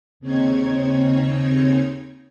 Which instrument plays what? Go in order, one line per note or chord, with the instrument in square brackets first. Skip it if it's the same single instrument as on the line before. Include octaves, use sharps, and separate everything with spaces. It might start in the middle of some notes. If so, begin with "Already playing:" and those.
[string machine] D#2 C#3 C4 D#4 C#5 G#6